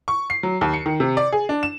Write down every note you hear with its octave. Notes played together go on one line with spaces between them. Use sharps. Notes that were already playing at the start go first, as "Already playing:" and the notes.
C#6
C7
F#3
D#2
C#7
D#3
C3
D5
G#4
D4
E7